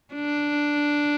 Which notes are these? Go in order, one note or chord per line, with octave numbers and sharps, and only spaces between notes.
D4